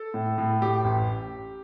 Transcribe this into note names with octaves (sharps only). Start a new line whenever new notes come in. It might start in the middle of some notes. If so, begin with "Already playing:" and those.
Already playing: A4
A2
A2
A2 G4
A1